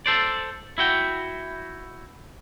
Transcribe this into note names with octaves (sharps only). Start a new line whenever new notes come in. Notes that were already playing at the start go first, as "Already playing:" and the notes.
A4 C5 D5
E4 F#4 G5